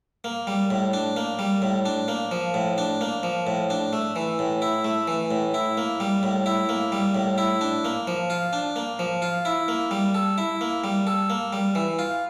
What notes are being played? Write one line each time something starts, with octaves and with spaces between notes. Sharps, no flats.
A#3
G3
A2
D4
A#3
G3
A2
D4
A#3
F3
A2
D4
A#3
F3
A2
D4
A3
E3
A2
E4
A3
E3
A2
E4
A#3
G3
A2
E4
A#3
G3
A2
E4
D4
A#3
F3
F4
D4
A#3
F3
F4
E4
A#3
G3
A4
E4
A#3
G3
A4
A#3
G3
E3
F4